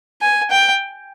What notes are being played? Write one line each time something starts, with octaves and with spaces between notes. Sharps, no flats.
G#5
G5